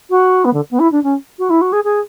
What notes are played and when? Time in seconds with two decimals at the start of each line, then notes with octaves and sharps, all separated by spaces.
0.10 F#4
0.45 B3
0.54 D3
0.71 B3
0.80 E4
0.92 D4
1.03 C#4
1.39 F#4
1.50 E4
1.61 F#4
1.73 G#4
1.84 G#4